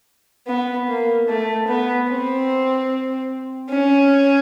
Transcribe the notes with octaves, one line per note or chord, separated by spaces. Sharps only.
B3
A#3
A3
B3
C4
C#4